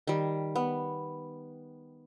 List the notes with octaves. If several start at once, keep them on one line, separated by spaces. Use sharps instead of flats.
D#3 G3
B3